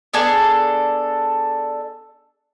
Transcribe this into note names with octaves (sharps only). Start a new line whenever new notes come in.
B3 D4 G#4 A4